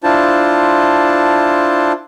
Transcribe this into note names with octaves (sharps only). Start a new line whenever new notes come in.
D4 E4 F4 C5 A5